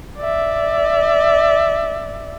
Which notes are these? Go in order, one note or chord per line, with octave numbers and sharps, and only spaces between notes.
D5 E5